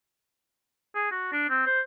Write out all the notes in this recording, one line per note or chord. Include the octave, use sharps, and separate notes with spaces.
G#4
F#4
D4
C4
C5